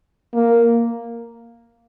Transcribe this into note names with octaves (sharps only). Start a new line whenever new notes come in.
A#3